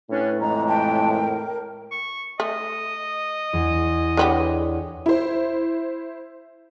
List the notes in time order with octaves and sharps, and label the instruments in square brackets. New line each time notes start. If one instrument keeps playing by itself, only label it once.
[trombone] A2 [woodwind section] C#4 D4 [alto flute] B4
[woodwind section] F2 E3 G#3 [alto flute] A#5
[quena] G5 [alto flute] A5
[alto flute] A#4
[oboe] C#6
[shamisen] A3 [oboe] D#5
[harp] E2
[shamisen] D3 B3 G4 [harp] G#4 C#5 D5
[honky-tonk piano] E4 C5